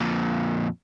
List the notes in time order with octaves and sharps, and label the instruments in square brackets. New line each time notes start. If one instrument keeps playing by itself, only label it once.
[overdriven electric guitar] F2 A#2